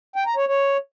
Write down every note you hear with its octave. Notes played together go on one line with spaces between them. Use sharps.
G5
A#5
C#5
C#5